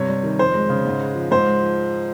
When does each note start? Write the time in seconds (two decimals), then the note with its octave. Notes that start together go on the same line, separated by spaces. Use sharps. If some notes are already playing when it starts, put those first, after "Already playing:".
Already playing: G2 C3 C#5
0.09 G3
0.23 D#3
0.39 F2 C5
0.54 G#3
0.69 C#3
0.85 G#2
1.00 G#3
1.15 F3
1.31 G#2 C5
1.47 G#3
1.62 F3